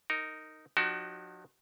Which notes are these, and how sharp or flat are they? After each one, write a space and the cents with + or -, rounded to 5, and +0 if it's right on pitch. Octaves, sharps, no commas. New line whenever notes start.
D#4 +0 A#4 -15
F3 +45 D#4 -40 F#4 +35